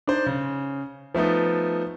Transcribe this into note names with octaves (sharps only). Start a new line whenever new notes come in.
D4 D#4 C5
C#3
F3 A3 B3 D#4